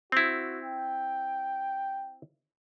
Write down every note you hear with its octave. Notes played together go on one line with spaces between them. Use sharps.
C4 E4 F#4
G5